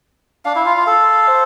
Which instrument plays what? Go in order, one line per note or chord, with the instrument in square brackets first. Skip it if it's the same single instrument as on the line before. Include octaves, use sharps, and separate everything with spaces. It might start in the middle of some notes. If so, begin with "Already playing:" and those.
[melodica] D4 [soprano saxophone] F5
[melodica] E4
F4
F4
A4
[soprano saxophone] C5